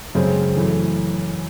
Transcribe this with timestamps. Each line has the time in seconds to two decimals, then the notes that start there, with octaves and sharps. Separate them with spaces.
0.15 F#2 C#3 G#3 C4
0.55 F#2 E3 A3